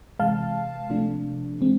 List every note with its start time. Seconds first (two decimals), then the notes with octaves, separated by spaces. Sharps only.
0.19 C3 E3 G#3 F5 A5
0.90 C3 F3 A3 D4
1.61 E3 G#3 C4